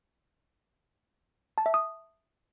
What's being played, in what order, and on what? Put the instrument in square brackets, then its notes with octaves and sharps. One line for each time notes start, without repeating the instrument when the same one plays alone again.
[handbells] A5
E5
D#6